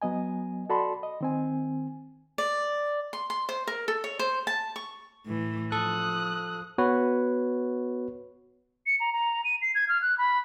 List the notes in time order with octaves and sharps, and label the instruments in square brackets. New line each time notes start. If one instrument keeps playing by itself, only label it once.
[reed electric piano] F#3 B3 D#5 G#5
F#4 A4 D5 A5 B5 C6
D#5
D#3 C4 G#5
[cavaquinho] D5
C6
C6
C5
A#4
A4
C#5
C5
A5
C#6
[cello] A2 E3
[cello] F3 [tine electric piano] A4 [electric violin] D#6 F#6
[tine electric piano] B3 F#4 B4 C#5
[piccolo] C#7
A#5
A#5
D#7
C7
G#6
F6
F#6
B5